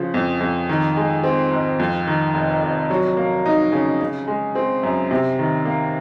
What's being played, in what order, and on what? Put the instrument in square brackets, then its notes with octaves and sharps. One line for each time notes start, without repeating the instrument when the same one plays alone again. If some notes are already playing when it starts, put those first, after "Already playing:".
Already playing: [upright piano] C#3 F3
F2
F2
D#3
G#3
C4
G#2
F2
D#3
F1
F1
F#3
A#3
D#4
C#3
C#3
G#3
C4
F#2
C3
D#3
A#3